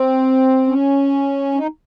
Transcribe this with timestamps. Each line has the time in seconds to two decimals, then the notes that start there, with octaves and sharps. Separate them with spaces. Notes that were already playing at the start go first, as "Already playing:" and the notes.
Already playing: C4
0.67 C#4
1.54 D#4